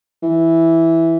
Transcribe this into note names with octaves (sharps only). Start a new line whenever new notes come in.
E3